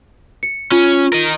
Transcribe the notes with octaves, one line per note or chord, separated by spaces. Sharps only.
C#7
C#4 F4
A#4 D#5